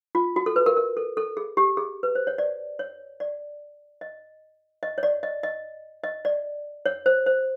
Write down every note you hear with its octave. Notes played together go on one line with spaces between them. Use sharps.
F4
F#4
A4
B4
A#4
A#4
A4
A4
G#4
G4
G#4
B4
C5
C#5
D5
C#5
D5
D#5
D#5
C#5
D5
D#5
D#5
D#5
D5
C#5
C5
C5